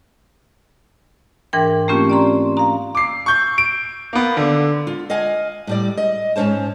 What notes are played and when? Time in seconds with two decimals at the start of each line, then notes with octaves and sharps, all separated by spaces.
1.53 G#2 E3 D4 A#4 G5
1.88 A3 A#3 C4 C#4 F4 G4
2.10 D5 A#5 C6
2.57 F5 A#5
2.95 D6 C7
3.26 C#6 G6
3.58 D7
4.13 A#3 B3
4.37 D3
4.87 F4
5.10 D#5 F5 F#5 G#5
5.67 A2 G3 D5
5.97 D#5
6.36 G#2 D#3 C#4 C5 A5